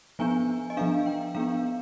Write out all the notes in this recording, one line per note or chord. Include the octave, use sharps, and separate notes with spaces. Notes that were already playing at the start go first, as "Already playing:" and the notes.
F3 B3 D4 G#5
D#5
F3 B3 D4 F5
G5
F3 B3 D4 F5